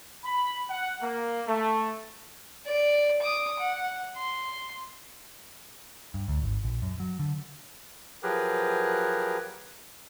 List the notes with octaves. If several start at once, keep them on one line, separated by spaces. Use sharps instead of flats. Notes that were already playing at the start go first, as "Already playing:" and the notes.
B5
F#5
A#3
A3
D5
D6 D#6
F#5
C6
G2
D2
G#1
A#1
F#2
F#3
D3
F3 F#3 G4 G#4 A#4 B4